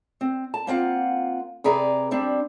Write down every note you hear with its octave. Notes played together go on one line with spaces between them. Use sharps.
C4
A5
A#3 C4 F4 F#5
C3 G#4 B4 D5 A#5
G3 C4 D4